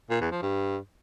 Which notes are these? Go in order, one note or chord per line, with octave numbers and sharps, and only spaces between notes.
A#2
E2
F3
G2